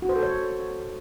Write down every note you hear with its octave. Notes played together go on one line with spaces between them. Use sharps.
F#4
C5
A4
C#5